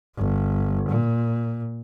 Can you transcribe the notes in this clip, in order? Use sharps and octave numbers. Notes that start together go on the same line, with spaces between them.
G1
A#2